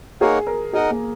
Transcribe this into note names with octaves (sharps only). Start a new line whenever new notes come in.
A#3 D#4 G#4 A#4 C#5 F#5
A#4
D#4 G#4 A#4 D#5 F#5
A#3